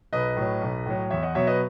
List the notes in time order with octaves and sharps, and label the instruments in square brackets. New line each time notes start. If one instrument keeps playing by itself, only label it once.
[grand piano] B1 B4 D#5
A2 F#3
B1
A2 F#3
E2 C#5 E5
D#5 F#5
B2 F#3 C#5 E5
B4 D#5